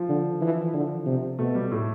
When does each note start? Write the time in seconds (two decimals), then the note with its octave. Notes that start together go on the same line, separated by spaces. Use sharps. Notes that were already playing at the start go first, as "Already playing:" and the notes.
Already playing: F3
0.09 D3
0.41 E3
0.74 D3
1.06 C3
1.39 B2 A3
1.55 G3
1.71 A2